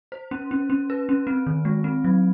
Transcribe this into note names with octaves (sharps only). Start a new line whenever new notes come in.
C5
C#4
C#4
C#4
B4
C#4
C4
D#3
G#3
C4
F#3